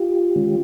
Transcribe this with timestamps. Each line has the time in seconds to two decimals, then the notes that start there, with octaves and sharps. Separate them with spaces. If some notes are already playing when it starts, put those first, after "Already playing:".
Already playing: F4 G4
0.36 D#3 G#3 C#4